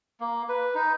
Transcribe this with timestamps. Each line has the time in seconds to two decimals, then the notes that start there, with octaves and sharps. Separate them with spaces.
0.20 A#3
0.49 B4
0.75 D#4